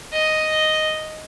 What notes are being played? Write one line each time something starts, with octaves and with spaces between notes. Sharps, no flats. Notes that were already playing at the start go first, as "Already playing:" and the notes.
D#5